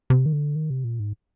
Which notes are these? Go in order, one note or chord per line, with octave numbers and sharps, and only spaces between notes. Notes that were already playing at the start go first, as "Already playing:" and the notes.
C3
D#3
D3
D#3
C3
A#2
G#2